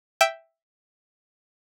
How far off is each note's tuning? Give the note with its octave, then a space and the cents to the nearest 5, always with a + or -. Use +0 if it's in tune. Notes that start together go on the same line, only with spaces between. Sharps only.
E5 +0 G5 +0